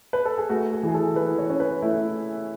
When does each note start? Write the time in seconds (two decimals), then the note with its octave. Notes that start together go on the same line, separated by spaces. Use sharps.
0.13 B4
0.25 A4
0.38 G#4
0.49 A3 F#4
0.72 G#4
0.83 E3 G#4
0.94 A4
1.16 E3 B4
1.38 C#5
1.49 C#4
1.60 B4
1.82 A3 E4